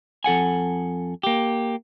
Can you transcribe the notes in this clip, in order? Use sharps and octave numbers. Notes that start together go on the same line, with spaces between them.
F2 A4 F#5 G#5
A#3 G4